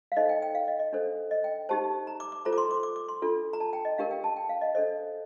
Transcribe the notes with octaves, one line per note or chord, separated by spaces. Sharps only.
F5
D#4 A4 C5 D#5
G5
G5
F5
D#5
D#5
D4 A4 C5
D#5
G5
D#4 G4 C5 A5
A#5
D6
D6
F4 A4 C5 A#5
D6
C6
D6
D6
D6
C6
D4 F4 A4
A#5
A5
G5
D#5
D4 G4 A#4 F5
G5
A5
G5
F5
D#5
D4 A4 C5 D#5